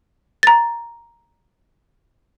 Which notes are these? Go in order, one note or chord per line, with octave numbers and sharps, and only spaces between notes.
A#5 A6